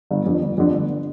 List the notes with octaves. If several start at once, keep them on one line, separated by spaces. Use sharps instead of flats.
G1
F2 D3
G1
F2 D3
G1
D3